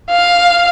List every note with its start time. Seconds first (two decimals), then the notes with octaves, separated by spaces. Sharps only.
0.10 F5